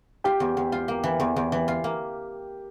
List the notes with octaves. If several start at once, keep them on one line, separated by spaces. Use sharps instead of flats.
F4 G4 G5
E2
E2
F4
A#3
E3
E2
E2
E3
F4
A#3